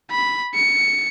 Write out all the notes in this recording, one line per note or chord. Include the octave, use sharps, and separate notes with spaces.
B5
C#7